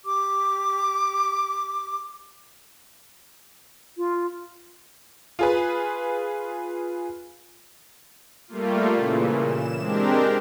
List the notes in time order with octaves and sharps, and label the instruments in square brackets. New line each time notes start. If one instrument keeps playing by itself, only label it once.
[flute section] G4 D6
[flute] F4
[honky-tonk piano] F4 G#4 B4
[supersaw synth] G3 A3 A#3 F4
A#2 C#3 E3
E7
G#3 C4 D4 G4 A#4